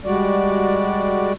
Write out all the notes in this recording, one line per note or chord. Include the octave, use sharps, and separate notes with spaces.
G3 G#3 F#4 D5